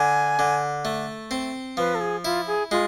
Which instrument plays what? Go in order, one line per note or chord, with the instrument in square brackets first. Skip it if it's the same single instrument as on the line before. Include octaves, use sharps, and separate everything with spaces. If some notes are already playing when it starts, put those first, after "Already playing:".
Already playing: [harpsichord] D3 [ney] G#5
[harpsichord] D3
A3
C4
[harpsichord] F3 [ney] B4
[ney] A4
G#4
[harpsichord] E4 [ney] F4
[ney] G#4
[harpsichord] G#3 [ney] F4